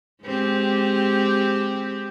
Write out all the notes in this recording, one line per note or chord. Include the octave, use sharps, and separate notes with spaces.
G#3 C4 G4